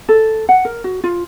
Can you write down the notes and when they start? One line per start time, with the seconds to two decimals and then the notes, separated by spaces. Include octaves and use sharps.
0.09 A4
0.49 F#5
0.65 A#4
0.84 F#4
1.04 F4